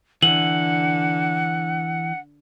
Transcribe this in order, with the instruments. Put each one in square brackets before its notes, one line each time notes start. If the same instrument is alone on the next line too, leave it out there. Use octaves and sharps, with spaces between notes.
[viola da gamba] D3 [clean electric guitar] E3 [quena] F#5 [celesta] F#7